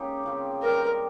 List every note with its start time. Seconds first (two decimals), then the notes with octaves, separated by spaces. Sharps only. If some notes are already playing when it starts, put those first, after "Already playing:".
Already playing: G#3 A#3 C#4 D#4 G4
0.23 C#3 F3 C4
0.63 D#3 G3 C4 G4 A#4